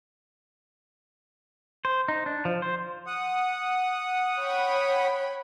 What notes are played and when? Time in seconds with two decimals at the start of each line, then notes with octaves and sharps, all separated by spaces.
1.85 C5
2.08 D#4
2.26 D4
2.45 F3
2.62 C5
3.07 F#5 D#6
4.39 C#5 G5 B5